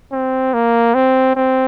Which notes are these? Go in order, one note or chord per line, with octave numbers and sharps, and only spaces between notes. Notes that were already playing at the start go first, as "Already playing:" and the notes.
C4
A#3
C4
C4